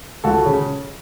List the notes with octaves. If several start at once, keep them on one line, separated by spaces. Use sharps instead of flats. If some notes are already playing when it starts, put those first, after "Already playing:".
C#2 F#4 A4
C#3